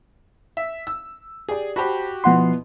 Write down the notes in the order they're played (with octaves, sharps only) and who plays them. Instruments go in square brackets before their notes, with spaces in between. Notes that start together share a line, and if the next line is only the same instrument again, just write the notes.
[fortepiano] E5
E6
[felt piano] G4 D5 [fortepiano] G#4
[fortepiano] F#4 G4 [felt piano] C5 A5 B5
[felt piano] B2 B3 E4 [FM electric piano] F3 F#5 C6